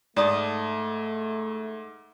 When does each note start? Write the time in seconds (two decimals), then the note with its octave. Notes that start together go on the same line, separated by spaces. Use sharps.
0.17 G#2 A3 D5 A5 D#6